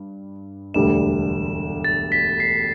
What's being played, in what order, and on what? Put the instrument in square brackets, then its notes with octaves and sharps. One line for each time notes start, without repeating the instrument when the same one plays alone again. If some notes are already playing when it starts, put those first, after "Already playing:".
Already playing: [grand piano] G2
[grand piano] E1 D2 D3 G3 [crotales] E7
[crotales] A6
B6
C7